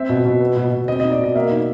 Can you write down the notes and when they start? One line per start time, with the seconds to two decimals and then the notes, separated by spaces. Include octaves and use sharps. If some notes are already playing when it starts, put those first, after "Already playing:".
Already playing: C4 E5
0.09 B2
0.25 B2
0.41 B3
0.56 B2
0.72 B2
0.88 C4 D#5
1.00 D#4 D#5
1.11 D5
1.19 B2 D#5
1.35 A#3 E5
1.51 D#4